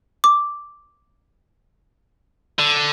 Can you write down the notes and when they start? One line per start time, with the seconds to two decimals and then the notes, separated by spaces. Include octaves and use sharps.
0.24 D6
2.59 D3